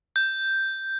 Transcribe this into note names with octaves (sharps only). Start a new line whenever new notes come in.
G6